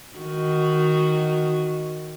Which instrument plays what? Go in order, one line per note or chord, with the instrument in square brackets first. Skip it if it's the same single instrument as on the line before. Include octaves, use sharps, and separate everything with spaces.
[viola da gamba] D#3 F#4